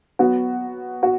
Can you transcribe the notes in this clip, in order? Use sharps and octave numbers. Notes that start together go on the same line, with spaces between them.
F#3 B3 F#4
F#4